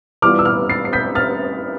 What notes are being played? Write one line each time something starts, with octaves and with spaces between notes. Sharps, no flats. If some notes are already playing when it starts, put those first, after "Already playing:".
E3 G3 B3 F4 D6 F6
E6
D6 F6
A6 C7
C7
G6 B6
F6 A6